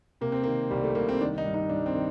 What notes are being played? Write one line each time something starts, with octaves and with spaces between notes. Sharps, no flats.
C3 A#3
C4
D#3 A#3
C2 G3
A3
C2 A#3
C4
D#3 D4
D#4
G2
D#4
G2 D4
C4
D#3